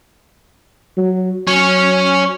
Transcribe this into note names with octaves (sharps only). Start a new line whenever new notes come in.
F#3
F#3 C#4 C#5